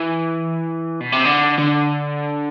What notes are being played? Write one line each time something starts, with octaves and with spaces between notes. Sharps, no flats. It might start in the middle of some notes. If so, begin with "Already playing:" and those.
Already playing: E3
B2
C3
D3
D3